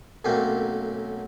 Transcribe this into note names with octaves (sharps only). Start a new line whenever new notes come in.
B1 F#2 A3 A#3 C4